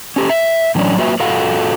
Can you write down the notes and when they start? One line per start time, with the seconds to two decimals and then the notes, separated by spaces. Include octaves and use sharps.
0.16 C#4 G4 A4
0.30 E5
0.75 A2 E3 F#3 C#4 D4 D5
0.97 F#3 A#3 F4 F#4 B4 E5
1.20 F4 F#4 A4 F5 F#5